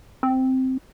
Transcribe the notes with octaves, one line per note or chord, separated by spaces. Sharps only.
C4